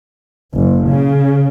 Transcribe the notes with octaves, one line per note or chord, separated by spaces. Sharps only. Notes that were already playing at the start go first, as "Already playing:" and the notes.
F#1
C#3